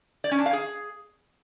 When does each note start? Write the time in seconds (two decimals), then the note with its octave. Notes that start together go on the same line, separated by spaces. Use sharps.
0.24 D5
0.31 C#4
0.39 D4
0.46 F5
0.53 G#4